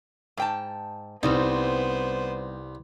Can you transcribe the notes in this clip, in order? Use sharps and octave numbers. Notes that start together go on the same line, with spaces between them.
G#2 G5 A5
C2 G3 B3 C4 D#4 C5